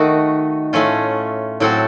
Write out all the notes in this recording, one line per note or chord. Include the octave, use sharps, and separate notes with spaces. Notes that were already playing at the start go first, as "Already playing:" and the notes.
Already playing: D#3 A3 D#4 F#4
A2 A3 C#4 F4
A2 F#3 C4 F#4 A4